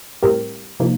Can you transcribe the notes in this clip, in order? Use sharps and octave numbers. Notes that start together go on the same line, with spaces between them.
A2 G3 C4 G4 A#4
C3 F3 A#3 D#4